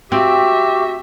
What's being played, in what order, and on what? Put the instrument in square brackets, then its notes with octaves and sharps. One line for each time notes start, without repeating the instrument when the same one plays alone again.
[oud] C4 [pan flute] F#4 [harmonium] G4 [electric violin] E5